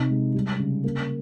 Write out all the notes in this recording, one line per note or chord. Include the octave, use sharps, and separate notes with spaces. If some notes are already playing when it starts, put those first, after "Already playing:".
Already playing: C3 D#4
G#3
G3
C#3
A#3